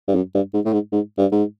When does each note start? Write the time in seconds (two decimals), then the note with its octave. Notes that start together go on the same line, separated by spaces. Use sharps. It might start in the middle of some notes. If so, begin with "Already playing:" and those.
0.08 G2
0.15 F#2
0.35 G2
0.54 G#2
0.65 A2
0.73 G#2
0.92 G#2
1.18 G2
1.32 G#2